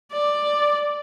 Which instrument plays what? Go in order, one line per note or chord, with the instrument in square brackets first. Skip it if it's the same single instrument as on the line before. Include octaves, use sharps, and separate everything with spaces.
[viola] D5